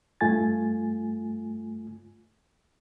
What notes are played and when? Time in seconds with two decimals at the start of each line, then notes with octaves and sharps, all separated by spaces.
0.21 G2 A3 F4 G#5 A6